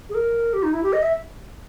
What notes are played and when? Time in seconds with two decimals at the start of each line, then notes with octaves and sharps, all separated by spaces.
0.09 G#4
0.15 A#4
0.53 G4
0.63 D#4
0.73 E4
0.83 G4
0.93 D#5
1.02 E5